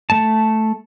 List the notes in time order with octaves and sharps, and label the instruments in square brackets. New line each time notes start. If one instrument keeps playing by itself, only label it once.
[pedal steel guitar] A3 A5